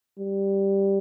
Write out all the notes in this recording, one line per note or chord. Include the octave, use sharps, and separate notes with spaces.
G3